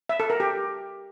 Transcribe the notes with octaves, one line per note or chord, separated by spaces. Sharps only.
E5
A4
A#4
G4